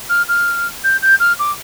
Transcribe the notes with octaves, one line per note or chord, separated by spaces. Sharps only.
F6
F6
G6
G6
F6
D6